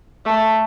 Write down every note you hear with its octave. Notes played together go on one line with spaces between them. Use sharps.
A3